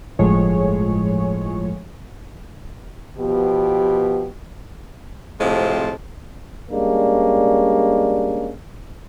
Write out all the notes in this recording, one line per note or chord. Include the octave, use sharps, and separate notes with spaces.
G1 A2 F3 G#3 G#4 C#5
B2 F3 B3 G4
A2 C3 F3 G#3 C4 A5
G3 G#3 A#3 C#4 D4